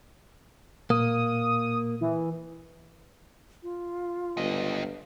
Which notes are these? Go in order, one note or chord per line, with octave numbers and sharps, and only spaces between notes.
A#2 A#3 D#6
E3
F4
G1 C#2 D#5